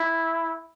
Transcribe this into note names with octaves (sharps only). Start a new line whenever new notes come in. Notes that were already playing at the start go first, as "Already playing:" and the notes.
Already playing: E4